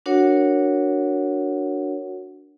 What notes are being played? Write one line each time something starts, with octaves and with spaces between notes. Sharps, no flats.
D4 F#4 A#4 C#5 F#5